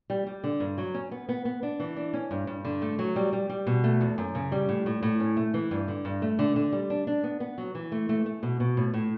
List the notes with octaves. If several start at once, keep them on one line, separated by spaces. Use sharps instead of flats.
G3
G3
D3
G2
F#3
C#4
B3
B3
B3
D4
E3
D4
C#4
G2
G2
D3
A3
F#3
G3
G3
G3
B2
A3
E2
F#2
C#3
G3
A2
A2
A2
C#4
A3
E3
G2
D3
G2
A3
D3
D3
G3
D4
D4
B3
B3
F#3
E3
A3
A3
A3
B2
B2
A2
A2